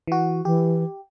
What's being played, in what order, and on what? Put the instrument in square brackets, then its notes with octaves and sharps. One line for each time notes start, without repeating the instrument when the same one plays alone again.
[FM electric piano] E3 F#4
[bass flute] E3 [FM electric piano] G4